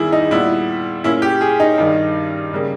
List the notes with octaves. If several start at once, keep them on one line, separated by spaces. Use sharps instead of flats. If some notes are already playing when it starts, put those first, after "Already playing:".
Already playing: E2 D#3 G3 E4 G#4
D#4
A#2 G3 B3 E4
A#2 A#3 C#4 E4
G4
G#4
D#4
G2 D#3 G3
C#3 G3 A#3